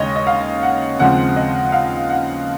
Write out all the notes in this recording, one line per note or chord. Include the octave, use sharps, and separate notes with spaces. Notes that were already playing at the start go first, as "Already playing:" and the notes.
Already playing: D#2 C#3 G#3 D#4 C#5 D#5
D#5
F5
F#5
D#2 C#3 F3 G#3 C4 F#5
D#5
F5
F#5